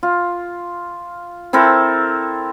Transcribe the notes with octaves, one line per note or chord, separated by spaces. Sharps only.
F4
C4 E4 A4 A#4